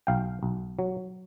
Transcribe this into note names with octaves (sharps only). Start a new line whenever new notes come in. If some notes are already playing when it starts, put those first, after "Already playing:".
B1 F5 G5
B1
F#3